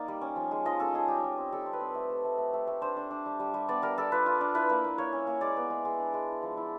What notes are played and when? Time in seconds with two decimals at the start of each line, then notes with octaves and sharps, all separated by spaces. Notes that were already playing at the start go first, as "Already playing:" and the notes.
Already playing: A#3 D#4 D5
0.08 G3
0.21 C#4
0.36 F3
0.51 G#3
0.65 F3 D#5
0.80 C#4 A4
0.94 G#3 G#4
1.08 G3 G4
1.24 G3
1.38 C4
1.53 G3 A4
1.66 C4
1.73 B4
1.80 C4
1.95 A3
2.10 A3
2.25 A3
2.38 A3
2.54 A3
2.67 A3
2.81 D4 C5
2.97 D4
3.11 D4
3.26 G3
3.40 G3
3.54 G3
3.68 B3 D5
3.82 G3 A#4
3.98 G3 A4
4.12 F4 B4
4.26 F4
4.41 D4
4.55 E4 B4
4.70 A#3
4.84 A#3
4.98 A#3 C#5
5.13 C#4
5.27 A#3
5.41 G#3 D5
5.57 B3
5.70 G#3
5.85 G#3
5.99 D4
6.14 G#3
6.29 E4
6.43 F3
6.57 E4